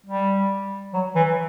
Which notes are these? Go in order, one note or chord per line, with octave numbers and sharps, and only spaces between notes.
G3
F#3
E3